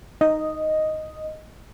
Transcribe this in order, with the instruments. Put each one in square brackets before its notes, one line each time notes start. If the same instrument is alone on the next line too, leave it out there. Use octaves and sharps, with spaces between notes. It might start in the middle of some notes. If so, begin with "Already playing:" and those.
[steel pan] D#4 [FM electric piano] D#5